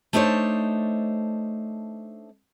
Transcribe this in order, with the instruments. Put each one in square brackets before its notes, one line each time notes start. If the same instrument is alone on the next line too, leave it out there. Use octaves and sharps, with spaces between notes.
[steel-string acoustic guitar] A3 D4 D#4 C5 C#5